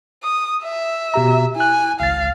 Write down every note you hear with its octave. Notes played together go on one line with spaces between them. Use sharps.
D#6
E5
B2 G4 A#5
E4 G#5 F#6
G#1 C#2 F5 A6